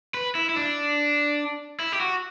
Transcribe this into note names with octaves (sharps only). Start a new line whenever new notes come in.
B4
E4
E4
D4
E4
G4
F#4